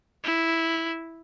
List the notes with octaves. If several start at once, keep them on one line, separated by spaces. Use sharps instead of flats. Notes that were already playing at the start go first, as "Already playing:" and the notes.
E4